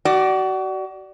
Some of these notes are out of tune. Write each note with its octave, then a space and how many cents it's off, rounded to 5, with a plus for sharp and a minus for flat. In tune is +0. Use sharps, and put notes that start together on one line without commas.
F#4 +35 D5 +5